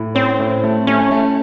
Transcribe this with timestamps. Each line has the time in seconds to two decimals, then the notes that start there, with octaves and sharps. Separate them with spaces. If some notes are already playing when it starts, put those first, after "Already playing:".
Already playing: A2
0.15 C4 C#4
0.39 A2
0.64 A3
0.87 A3 C#4
1.11 A3